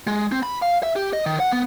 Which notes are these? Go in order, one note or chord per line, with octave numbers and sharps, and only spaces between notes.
G#3
C4
B5
F5
E5
G4
D#5
D#3
F#5
B3